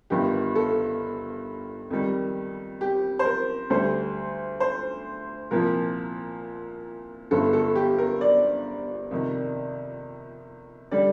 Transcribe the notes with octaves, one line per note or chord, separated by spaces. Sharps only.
G1 G2 D#3 G4
A4
F2 D#3 G3
G4
C5
A#4
D2 D3 G3 C5
C5
C2 A#2 F3 A#4
G1 G2 D3 A4
A4
G4
A#4
D5
F2 C3 D#3
D3 G3 D5